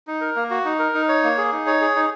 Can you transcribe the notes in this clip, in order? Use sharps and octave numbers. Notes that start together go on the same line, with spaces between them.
D#4
A#4
A#3
F#4
D#4
A#4
D#4
C#5
A#3
G#4
D#4
C#5
G#4
D#4